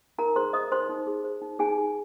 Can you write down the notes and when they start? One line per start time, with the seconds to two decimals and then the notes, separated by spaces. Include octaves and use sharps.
0.18 D#4 A#4 A#5
0.36 G#4 C5 C6
0.53 C5 D#5 D#6
0.72 D#4 C5 C6
0.89 D#4
1.07 G#4
1.24 C5
1.42 D#4
1.59 D#4 G#4 G#5
1.78 G#4